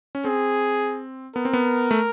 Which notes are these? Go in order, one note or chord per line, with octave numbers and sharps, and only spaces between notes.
C#4
C4 G#4
B3 A#4
C4
B3
A3